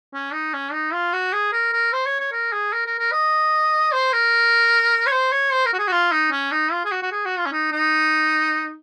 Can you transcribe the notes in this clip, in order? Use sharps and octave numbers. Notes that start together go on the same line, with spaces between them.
C#4
D#4
C#4
D#4
F4
F#4
G#4
A#4
A#4
C5
C#5
C#5
A#4
G#4
A#4
A#4
A#4
D#5
C5
A#4
C#5
C5
C#5
C5
A#4
F#4
G#4
F#4
F4
D#4
C#4
D#4
F4
G#4
F#4
F#4
G#4
F#4
F4
C#4
D#4
D#4